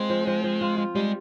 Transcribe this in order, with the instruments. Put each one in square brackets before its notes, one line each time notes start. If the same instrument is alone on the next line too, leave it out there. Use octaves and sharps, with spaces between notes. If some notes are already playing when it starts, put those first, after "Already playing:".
Already playing: [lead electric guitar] G#3 [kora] C4 F4
[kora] F3
F3
F3
F4
F4
[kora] G3 [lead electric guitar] G#3